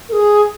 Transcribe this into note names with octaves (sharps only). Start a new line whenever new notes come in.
A#4
G#4